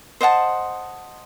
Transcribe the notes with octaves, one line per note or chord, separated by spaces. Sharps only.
C5 D#5 F#5 A5